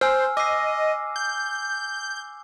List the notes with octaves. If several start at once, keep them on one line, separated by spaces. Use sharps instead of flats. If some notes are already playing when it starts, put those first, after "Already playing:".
C5 G#5 E6 F6
D#5 D6 E6 C7
G6